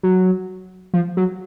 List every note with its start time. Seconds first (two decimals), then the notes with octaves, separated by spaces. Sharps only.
0.03 F#3
0.94 F3
1.17 F#3